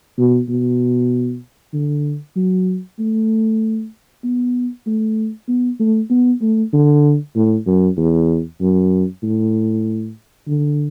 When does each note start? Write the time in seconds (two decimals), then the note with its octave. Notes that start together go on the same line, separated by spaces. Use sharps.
0.18 B2
0.49 B2
1.74 D3
2.36 F#3
2.99 A3
4.24 B3
4.86 A3
5.48 B3
5.80 A3
6.10 B3
6.42 A3
6.73 D3
7.35 A2
7.67 F#2
7.97 E2
8.61 F#2
9.23 A2
10.48 D3